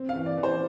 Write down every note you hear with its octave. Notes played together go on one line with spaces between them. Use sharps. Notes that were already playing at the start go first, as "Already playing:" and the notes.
Already playing: C4
F5
E3
D5
E3
C5